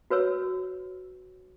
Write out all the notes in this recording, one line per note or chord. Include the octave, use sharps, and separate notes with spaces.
F#4 B4 C#5 E6